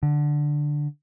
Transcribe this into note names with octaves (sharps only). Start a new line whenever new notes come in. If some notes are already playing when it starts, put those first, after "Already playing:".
D3